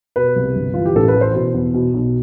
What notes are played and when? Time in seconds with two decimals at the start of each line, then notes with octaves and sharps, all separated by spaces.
0.16 B2 B4
0.36 C2
0.56 G1
0.74 E3 F4
0.86 G4
0.95 A1 A4
1.08 B4
1.14 E3
1.21 C5
1.34 B2
1.54 E2
1.74 B2
1.94 B1